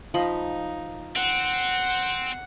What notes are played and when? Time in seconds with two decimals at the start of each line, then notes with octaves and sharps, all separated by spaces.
0.14 F3 D#4 D#5 B5
1.16 C4 F#5